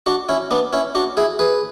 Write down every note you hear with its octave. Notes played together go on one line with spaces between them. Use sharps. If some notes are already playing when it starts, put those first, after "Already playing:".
D4 F#4
C#4 E4
B3 D4
C#4 E4
D4 F#4
E4 G#4
G#4 B4